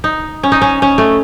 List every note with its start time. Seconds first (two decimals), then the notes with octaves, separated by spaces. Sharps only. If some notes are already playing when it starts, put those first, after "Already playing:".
0.04 D#4
0.43 C#4
0.52 D#4
0.61 C#4
0.82 C#4
0.98 A3